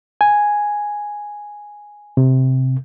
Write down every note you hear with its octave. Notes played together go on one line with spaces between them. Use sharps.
G#5
C3